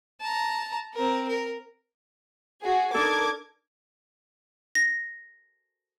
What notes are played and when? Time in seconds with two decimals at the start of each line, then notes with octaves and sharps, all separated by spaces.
0.21 A5 A#5
0.94 C4 A#4
1.28 A#4
2.62 F#4 G#4
2.94 D4 D#4 A4 A#4 D6 G#6
4.75 A#6